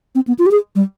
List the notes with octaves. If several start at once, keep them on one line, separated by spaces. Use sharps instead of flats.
C4
B3
F4
G4
G#4
G3